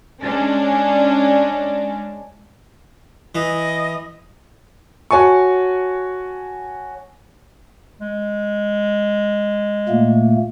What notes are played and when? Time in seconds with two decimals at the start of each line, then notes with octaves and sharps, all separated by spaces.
0.22 G#3 C#4 D4
3.35 E3 D#5
5.11 F#4 C#5 G#5 A5 C#6
8.01 G#3
9.89 A#2 A3 A#3